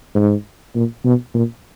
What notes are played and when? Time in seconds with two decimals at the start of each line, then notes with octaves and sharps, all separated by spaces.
0.15 G#2
0.75 A#2
1.05 B2
1.34 A#2